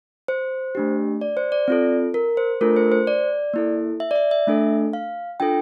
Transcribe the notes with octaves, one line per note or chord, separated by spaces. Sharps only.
C5
A3 D4 G4
D5
C5
D5
C4 F4 A4
A#4
C5
A3 D4 F4 A4 A#4
C5
C5
D5
A#3 E4 A4
E5
D5
E5
E5
A3 D4 A4
F5
D4 F4 A4 G5